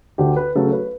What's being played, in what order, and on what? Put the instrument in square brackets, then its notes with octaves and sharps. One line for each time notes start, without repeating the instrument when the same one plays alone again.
[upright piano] D2 G4
B4
C#3 F#3 A3 A4
B4